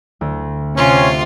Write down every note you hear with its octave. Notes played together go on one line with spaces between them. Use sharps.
D2
C3 C#4 F4